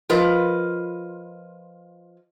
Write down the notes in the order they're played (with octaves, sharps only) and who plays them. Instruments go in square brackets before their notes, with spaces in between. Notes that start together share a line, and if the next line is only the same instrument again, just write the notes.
[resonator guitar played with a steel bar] F3 F4 A#4 B4 D#5